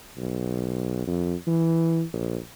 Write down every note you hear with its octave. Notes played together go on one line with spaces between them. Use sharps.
B1
F2
E3
A#1